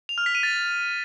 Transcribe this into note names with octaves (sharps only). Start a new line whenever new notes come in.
F7
F6
B6
D#7
A6